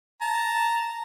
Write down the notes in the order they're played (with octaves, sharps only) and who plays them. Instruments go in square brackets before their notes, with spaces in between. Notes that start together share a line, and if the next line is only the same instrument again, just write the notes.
[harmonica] A5 A#5